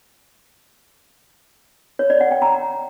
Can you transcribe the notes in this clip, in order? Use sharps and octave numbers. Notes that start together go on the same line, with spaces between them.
C#5
D5
F#5
G5
A#5